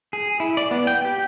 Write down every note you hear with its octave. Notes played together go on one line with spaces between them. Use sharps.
G#4
E4
D5
B3
G5
G4